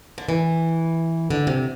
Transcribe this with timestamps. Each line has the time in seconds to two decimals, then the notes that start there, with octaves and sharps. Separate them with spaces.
0.18 D3
0.29 E3
1.30 D3
1.47 C3